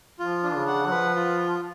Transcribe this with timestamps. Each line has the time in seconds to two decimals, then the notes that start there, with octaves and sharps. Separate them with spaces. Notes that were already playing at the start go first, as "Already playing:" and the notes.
0.19 F3 F4
0.43 D4
0.55 C#3
0.68 F#5
0.86 F#3
0.91 F3 B4
1.16 F4